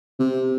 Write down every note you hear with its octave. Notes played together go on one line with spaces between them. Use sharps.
C3